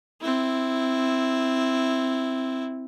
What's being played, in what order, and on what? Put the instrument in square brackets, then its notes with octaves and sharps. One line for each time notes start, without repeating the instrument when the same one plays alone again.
[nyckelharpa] C4 E4